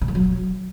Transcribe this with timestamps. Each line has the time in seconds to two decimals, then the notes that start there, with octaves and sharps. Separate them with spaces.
0.01 C#3
0.08 D#3
0.15 F#3